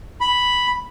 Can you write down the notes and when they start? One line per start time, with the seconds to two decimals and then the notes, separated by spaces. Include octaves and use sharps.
0.21 B5